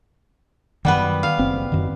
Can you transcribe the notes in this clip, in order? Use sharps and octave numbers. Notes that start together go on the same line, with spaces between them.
F#2 D#3 G3 B3 B4
F5
F#1 C4
F#2 D#3